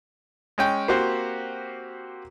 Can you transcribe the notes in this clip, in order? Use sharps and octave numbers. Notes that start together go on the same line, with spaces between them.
G#3 C#4 G5
A#3 C4 F#4 G4 C5